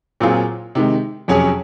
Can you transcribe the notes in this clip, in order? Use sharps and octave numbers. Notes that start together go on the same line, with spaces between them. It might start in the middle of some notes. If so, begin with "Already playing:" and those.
A#2 F#3 C4 F4 G#4
C3 D#3 G#3
F2 C3 F#3 C#4 G#4